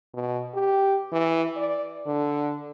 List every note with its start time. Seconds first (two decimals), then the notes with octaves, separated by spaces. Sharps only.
0.14 B2
0.55 G4
1.13 E3
1.56 D5
2.06 D3